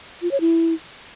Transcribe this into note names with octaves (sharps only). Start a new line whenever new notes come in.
F4
C#5
E4